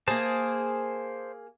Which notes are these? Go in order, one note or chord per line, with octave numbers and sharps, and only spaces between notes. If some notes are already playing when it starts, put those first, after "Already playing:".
A#3 G#4 C5 A5